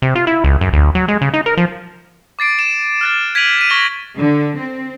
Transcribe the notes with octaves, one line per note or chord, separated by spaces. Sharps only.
C3
F4
E4
C#2
F#2
D2
F#3
G#3
C#3
D#4
A#4
F3
D6 A6 C7 D7
E7
F6 F#6 A6
G#6 B6 D7 D#7 F7 F#7
B6 D#7
C#6 A#6 B6 G7
D3
C4